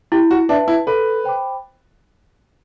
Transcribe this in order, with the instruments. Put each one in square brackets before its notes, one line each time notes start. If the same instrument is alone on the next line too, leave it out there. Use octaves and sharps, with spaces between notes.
[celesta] E4 [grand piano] G4
[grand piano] F#4
[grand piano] D4 [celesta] B4 E5 A5
[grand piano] E4
[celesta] A4 [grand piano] B4
[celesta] C5 G5 B5 D6